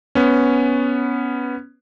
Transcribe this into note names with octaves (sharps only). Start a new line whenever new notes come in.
B3 C#4